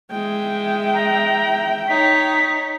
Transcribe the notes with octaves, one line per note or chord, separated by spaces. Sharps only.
G#3 E5 G5
A#5
D#4 C#5 B6